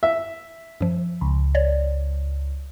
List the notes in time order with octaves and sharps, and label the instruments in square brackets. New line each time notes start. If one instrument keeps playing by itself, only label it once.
[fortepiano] E5
[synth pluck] F#2 F3
[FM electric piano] C#2
[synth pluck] C#5 D5